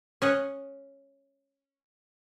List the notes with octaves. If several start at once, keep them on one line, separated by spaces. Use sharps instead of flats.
C#4 D#5 F#5